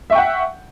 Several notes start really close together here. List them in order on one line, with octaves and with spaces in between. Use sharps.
E5 C#6 G5 F#5